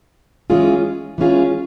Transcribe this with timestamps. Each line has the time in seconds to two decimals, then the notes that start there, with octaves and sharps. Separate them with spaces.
0.50 E3 G#3 C#4 F4 G#4
1.18 E3 G#3 C#4 F4 G#4